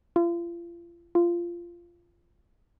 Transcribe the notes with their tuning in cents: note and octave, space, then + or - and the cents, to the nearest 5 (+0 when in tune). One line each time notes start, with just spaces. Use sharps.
F4 -35
F4 -15